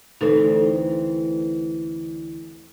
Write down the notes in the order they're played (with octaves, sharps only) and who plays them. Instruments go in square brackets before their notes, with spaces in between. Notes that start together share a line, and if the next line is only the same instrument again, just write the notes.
[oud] D2 E3 C4 [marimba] D#4 A4